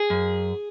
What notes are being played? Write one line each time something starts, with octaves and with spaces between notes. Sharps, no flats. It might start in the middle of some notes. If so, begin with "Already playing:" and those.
Already playing: G#4
F#2